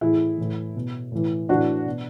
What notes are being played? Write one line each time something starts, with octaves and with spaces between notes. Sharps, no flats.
A2 E3 E4 G#4
A2 E3
B2
A2 E3
A2 E3 D4 F#4
B2